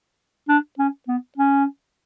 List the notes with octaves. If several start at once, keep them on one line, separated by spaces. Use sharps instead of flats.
D4
C#4
B3
C#4